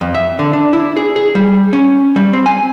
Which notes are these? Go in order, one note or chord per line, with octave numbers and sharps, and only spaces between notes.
F2
E5
D3
D4
E4
G#4
G#4
G3
C#4
G3
C4
G#5